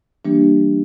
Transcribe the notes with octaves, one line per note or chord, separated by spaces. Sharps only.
E3 G3 A#3 D4 G4